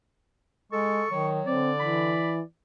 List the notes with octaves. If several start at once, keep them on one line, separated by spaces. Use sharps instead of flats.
G#3 A4 C#6
D#3 F#3
D3 C4 D5
E3 B5